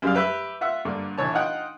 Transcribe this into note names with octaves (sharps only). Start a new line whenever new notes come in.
F#2 G3 F5
G4 B4 E5
F4 E5 F#5
G2 D3 A#3
A#1 E3 C#5 A5
D#4 F4 F#5 G5